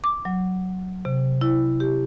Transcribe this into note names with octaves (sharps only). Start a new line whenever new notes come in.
D6
F#3
C3
E4
G4